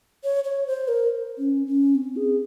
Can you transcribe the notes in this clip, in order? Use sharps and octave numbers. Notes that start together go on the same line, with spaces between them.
C#5
C#5
C5
A#4
C#4
C#4
C4
G#4